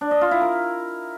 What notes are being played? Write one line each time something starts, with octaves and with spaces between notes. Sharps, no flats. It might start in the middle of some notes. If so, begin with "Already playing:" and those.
D4
D#5
F4
E4
A#4